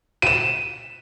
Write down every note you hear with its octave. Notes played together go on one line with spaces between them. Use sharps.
D#7 E7